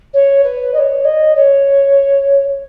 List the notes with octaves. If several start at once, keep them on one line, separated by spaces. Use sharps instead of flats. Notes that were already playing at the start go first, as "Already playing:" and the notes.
C#5
B4
D#5
C#5
D#5
C#5